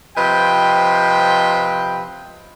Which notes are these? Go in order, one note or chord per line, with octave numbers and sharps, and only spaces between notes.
C3 F3 B4 D#5 G5